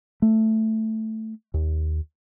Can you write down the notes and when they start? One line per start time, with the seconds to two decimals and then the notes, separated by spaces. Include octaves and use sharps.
0.22 A3
1.54 D#2